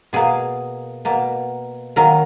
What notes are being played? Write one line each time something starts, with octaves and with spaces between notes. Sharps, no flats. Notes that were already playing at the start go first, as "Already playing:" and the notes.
B2 A#3 G#4
B2 A#3
D#3 F#3 A#3 A#4